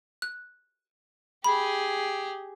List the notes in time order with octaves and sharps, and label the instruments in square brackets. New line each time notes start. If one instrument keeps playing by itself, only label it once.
[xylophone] F#6
[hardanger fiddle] G4 G#4 [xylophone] B5